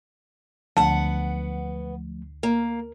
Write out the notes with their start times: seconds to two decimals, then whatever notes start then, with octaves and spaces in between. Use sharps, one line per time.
0.77 D2 D3 F3 A3 B3 F#5 A5
2.43 A#3 A#4